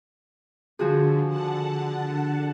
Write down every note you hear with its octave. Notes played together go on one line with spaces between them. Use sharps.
D3 F3 F#4 G#4
D3 F#5 A5